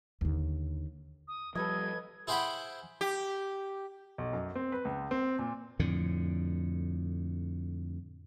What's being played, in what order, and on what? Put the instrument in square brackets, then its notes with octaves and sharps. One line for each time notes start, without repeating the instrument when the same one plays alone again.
[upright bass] D#2 D3
[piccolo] D#6
[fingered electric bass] F3 G3 [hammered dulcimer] A4 B4 D#5 [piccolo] G#6
[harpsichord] E4 G#4 C5 F#5 G5 B5
[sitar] G4
[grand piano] B1
F#2
C4
B4
C#2
C4
A#2
[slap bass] F2 A2 D3